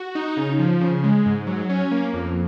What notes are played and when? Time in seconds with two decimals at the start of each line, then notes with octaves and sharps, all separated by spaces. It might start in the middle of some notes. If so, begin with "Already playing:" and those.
Already playing: F#4
0.15 D#4
0.37 C#3
0.59 F3
0.81 C#3
1.04 G#3
1.26 G#2
1.47 F#3
1.69 C#4
1.91 A#3
2.13 F2